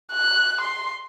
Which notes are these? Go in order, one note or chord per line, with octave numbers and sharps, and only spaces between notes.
F#6
C6